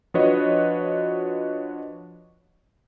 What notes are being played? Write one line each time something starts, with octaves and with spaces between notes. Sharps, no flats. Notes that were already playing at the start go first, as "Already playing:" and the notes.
F3 D4 F#4 B4 C#5 D#5